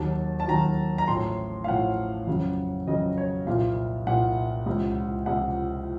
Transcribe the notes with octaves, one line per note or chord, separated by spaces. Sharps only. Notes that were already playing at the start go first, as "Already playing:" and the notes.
Already playing: D#2 D#3 F#3 A5
A5
D#2 D#3 F#3 A#5
A#5
A1 A2 F3 C6
F5
A1 A2 F3 F#5
F2 C#3 F#3
F2 C#3 F#3 D#5
C#5
C2 A#2 F3 F5
C2 A#2 F3 F#5
C#2 C3 F3
C#2 C3 F3 F#5